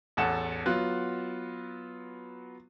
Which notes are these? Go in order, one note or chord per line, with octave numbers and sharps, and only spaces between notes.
A1 E2 A4 F#5 E7
F#3 B3 F4 F#6